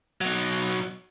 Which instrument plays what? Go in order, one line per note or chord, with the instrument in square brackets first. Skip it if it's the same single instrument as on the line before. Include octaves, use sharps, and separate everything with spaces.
[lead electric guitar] B2 F#3